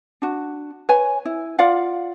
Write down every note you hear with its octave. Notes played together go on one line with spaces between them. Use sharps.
D4 F#4
B4 C#5 G#5
E4
F4 D5 F5 F#5